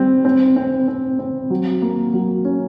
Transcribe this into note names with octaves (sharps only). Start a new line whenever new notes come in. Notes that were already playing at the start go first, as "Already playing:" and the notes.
Already playing: G3 C4
C4
C4
C4
C4
F#3
A#3
F#3
C#4